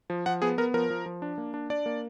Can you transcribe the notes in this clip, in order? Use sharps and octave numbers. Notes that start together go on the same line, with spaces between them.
F3
F3 F#5
B3 G#4
B3 A#4
F3 A#4
F3
F3
D4
A#3
D4
D4 D5
A#3